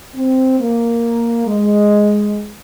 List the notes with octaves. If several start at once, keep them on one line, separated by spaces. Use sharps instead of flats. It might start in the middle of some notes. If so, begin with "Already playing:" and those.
C4
A#3
G#3